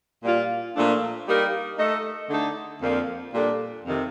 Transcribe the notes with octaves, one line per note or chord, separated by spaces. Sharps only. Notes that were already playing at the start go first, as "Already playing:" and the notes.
A#2 G3 A#3 F4
A#2 F3 A3 D4
G3 A#3 D#4 G4 A#4
A3 D#4 A4 D#5
D3 A3 D#4 A4
F2 D3 F3 A#3
A#2 G3 D4 A4
F2 C3 D#3